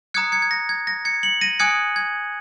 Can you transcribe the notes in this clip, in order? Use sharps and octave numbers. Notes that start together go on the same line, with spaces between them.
A#5 D#6 F#6 G#6 C#7
G#6 C#7
G#6
A#6
G#6
A#6
G#6 C#7
C#7 F#7
A#6 D#7
G#5 D#6 F#6 G#6 C#7
G#6